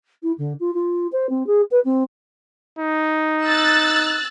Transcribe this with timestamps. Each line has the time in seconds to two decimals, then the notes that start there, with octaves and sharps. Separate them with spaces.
0.23 E4
0.38 D3
0.60 F4
0.74 F4
1.12 C5
1.29 C4
1.47 G#4
1.71 B4
1.84 C4
2.79 D#4
3.44 E6 F#6 A6